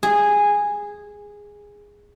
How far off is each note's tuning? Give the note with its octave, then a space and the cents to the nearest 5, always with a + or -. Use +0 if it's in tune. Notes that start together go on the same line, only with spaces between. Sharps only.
G#4 -10